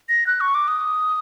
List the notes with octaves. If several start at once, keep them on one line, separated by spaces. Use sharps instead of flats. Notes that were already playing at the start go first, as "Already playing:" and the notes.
A#6
F#6
C#6
D6
D#6